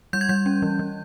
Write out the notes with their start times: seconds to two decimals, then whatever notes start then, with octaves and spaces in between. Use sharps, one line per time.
0.13 G3 G6
0.21 G#6
0.29 G3 G6
0.46 C#4
0.62 E3
0.79 E3